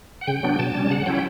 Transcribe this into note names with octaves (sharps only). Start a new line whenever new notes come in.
F#5
C#3 G5
F#3 B3 D4
B2 A5
G3 C#4
C#3 F#5
F#3 C#4 E4 G5